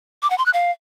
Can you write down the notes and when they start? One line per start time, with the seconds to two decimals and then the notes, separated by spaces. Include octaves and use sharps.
0.22 D6
0.30 F#5
0.38 C6
0.46 F#6
0.53 F5